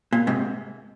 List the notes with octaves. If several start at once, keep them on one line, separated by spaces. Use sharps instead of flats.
A#2
G#2 C3